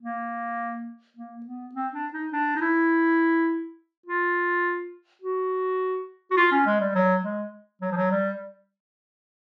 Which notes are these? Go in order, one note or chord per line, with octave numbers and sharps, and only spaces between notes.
A#3
A#3
B3
C4
D4
D#4
D4
D#4
E4
F4
F#4
F#4
F4
C#4
G#3
G3
F#3
G#3
F#3
F3
F#3
G3